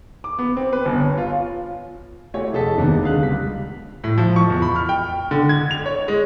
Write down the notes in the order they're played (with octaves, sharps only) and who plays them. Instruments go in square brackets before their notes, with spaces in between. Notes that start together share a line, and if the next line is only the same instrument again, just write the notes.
[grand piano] D6
B3
C4
B4
G1
C#5
F4
A3 E4 F#4 G4 C#5 G#5
F1 G#4 A4 D#5 A5 B6
D#2 C3 D#3 G#3 A#3 B3
D3 G#4 F5 F#6
C#2 G3 B6
A2
F3
C#6
E2
B5
F6
G5
D3
G#6
F7
C#5
G#3